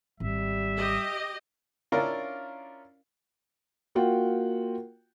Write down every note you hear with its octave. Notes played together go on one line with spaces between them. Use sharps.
G#1 G3 E5
G4 D#5
C#4 D4 E4 F4 A#4 D5
A#3 F4 F#4 F#5 G5